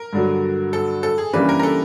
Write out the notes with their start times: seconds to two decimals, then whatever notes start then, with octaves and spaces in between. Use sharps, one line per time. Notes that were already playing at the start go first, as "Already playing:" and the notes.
Already playing: A#4
0.13 G2 D3 F#3
0.73 A4
1.03 A4
1.18 G#4
1.33 C#3 E3 G3 A#3 D4 B4
1.49 A#4
1.59 A#4
1.63 A4